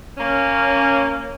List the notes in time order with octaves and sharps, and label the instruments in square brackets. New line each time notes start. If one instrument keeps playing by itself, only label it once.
[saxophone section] A#3 C#4